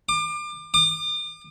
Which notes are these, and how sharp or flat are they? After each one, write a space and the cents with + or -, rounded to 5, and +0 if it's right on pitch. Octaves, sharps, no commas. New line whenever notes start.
D6 +35
D6 +45